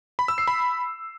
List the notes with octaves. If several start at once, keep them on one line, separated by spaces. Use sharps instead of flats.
B5
E6
C7
B5